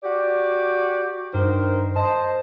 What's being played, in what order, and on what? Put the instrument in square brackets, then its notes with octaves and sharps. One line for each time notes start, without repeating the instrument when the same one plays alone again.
[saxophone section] F#4 G4 D5
[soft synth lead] G2 [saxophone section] D#3 A#4 C5
[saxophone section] C5 D#5 [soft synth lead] A5